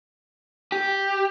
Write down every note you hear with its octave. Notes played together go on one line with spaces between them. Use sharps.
G4